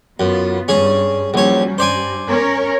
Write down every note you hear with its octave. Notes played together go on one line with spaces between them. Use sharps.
F#2 B3 F4
G2 C#4 G#4
A#1 F#3 G3 C#4 C#5
G2 C5 D5 G#5
C#4 A#4 C#5